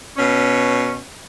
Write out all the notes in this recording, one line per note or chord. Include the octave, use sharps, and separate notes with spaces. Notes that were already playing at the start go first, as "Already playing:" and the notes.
B2 C#4